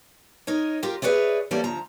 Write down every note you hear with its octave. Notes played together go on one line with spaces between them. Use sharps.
D#4 A#4 C#5 D#5
F4 G4 A#4 G5
G#4 B4 C#5 D5 E5
E3 G3 A#3 C#4 A4 D5
D2 F3 A#5